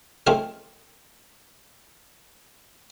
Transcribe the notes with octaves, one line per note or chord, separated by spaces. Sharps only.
F3 A3 C4 D#4 G#4 A#4